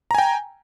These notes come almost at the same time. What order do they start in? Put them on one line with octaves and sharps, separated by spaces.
A#5 G#5 G5